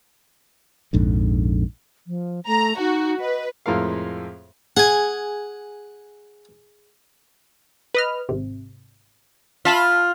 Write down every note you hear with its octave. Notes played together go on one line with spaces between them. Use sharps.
A#1 F2 G#2 D3
F3
A3 A#5
D#4 F#4
B4 D#5
F2 A2 G#3 A#4 F5
G#4 F#5 G#5
B4 D#5 F6
G#1 C3
F4 E5 A5 B5